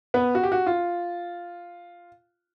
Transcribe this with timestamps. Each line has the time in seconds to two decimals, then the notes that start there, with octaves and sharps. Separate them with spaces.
0.14 B3 B4
0.35 F#4
0.43 G4
0.52 F#4
0.67 F4